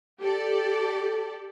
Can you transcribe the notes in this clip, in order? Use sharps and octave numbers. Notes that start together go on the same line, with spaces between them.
G4 A4 D5